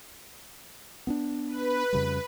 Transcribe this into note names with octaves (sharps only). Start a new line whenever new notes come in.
B3 C4 D4
B4
F2 C#3 G3